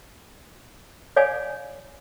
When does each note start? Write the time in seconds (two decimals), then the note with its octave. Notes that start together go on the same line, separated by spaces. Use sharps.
1.16 C#5 D5 F5 G#5